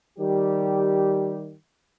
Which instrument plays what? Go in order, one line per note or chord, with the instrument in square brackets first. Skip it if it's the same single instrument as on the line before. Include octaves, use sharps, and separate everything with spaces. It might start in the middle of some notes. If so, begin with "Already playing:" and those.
[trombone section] D#3 G3 G4